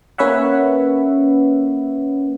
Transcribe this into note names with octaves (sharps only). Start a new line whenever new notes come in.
A#3 C#4 B4 C#5 E5 F#5